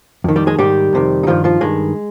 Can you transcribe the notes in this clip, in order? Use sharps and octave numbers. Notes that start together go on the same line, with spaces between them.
F2 D#3
G3 G4
G#3 G#4
G#2 D#3 G3 G4
F2 C3 D#3
D#4
G2 D#3 F3 F4
F3 F4
G2 D#3 G#3